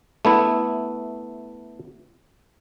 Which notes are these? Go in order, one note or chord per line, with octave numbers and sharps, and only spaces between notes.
A3 B3 E4